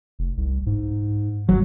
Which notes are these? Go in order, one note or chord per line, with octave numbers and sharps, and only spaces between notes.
F1
C2
G#2
G1 F#3